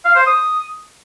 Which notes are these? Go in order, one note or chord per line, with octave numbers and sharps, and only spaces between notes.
F5
C5
D#6